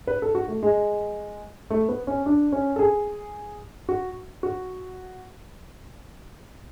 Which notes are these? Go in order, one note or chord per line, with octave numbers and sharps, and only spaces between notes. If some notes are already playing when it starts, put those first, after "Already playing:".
B4
A4
F#4
A3
G#3
A3
B3
C#4
D4
C#4
A4
G#4
F#4
F#4